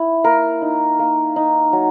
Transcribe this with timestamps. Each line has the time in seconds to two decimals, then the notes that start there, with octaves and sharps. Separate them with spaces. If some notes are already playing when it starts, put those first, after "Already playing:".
Already playing: E4
0.24 A#3 A#4
0.62 D#4
0.99 A#3
1.36 D#4
1.73 F#3